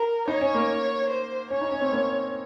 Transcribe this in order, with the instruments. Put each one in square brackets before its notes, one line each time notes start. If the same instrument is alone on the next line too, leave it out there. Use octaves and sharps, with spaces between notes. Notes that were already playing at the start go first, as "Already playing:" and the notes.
Already playing: [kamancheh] A#4
[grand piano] D#4 [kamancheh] C#5
[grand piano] C#4
A#3
[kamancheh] C5
[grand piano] C#4 [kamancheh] C#5
[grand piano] D#4
C#4
C4
A#3